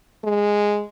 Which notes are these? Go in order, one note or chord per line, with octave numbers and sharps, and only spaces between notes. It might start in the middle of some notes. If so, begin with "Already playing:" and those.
G#3